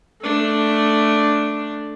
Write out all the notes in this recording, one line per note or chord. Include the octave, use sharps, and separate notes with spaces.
A3 D4